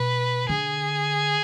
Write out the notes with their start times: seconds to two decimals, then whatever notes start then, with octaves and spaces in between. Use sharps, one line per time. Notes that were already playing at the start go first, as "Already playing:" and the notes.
Already playing: B2 B4
0.49 D3 G#4